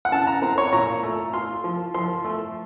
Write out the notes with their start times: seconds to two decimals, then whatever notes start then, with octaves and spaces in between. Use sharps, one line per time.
0.05 F#5
0.12 C#3 A5
0.27 A#5
0.42 C4 A#5
0.58 C#5
0.73 A#2 A#5
1.03 A3
1.33 F4 C6
1.64 F3
1.94 F3 C6
2.25 A3